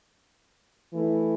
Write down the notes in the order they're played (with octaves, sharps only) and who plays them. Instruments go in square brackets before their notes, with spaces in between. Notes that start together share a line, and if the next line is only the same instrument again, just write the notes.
[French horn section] E3 A3 E4